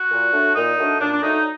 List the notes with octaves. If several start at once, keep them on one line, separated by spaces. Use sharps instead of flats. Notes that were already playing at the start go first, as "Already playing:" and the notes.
Already playing: F#4
A#2
F#3 A3 D4
A#2 D#4
F#3 A3 D4
A#2 D4
D4
F#3 A3 D4 D#4